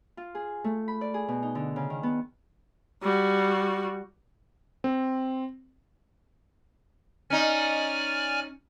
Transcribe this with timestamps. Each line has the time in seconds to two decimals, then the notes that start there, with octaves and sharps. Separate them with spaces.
0.17 F4
0.35 G#4
0.64 A3
0.88 B5
1.01 D5
1.14 G#4
1.28 B2
1.43 D#4
1.55 D3
1.76 C#3
1.90 D#3
2.03 B3
3.03 G3 F#4
4.84 C4
7.30 C#4 D#4 D5 G#5 F6